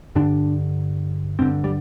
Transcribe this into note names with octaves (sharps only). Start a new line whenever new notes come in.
G2 D3 D4
G2 D3 C4
G3